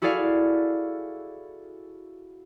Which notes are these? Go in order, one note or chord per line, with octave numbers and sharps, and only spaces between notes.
E4 F#4 G#4 A4 D5 F5